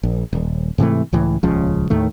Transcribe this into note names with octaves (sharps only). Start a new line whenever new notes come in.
A#1
D#1
G#2 C3 E3 A3
C#2 A2 E3
D#1 C#2 C#3 F3
D#2 A2 D#3 A3